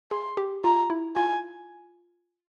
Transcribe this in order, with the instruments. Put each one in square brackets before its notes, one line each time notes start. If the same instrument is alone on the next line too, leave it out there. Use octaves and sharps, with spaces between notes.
[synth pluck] G#4 [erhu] C6
[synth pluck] G4
[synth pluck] F4 [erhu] A#5
[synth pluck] E4
[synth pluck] F4 [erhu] G#5